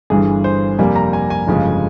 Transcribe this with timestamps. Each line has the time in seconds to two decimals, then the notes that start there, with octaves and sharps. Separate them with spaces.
0.10 G1 G2 E3 G#4
0.44 C5
0.79 F2 C3 G3 A#3 G#5
0.96 A#5
1.13 G#5
1.30 G#5
1.48 G1 F2 C#3 F3 G#3